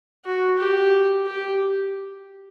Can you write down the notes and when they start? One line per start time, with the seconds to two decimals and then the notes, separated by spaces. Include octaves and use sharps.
0.25 F#4
0.59 G4
1.26 G4